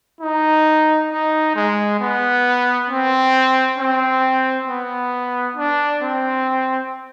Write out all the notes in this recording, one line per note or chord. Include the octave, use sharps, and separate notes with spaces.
D#4
D#4
G#3
B3
C4
C4
B3
D4
C4